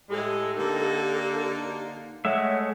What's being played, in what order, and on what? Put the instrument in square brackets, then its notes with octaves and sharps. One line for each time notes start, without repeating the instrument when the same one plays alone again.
[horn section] A2 G#3 [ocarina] G4 [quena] A4
[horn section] D3 A#3 D#4
[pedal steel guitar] G#3 A3 E5 [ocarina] C#5 [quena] F#5